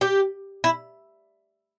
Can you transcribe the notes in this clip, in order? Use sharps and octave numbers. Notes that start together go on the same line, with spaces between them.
G4
E4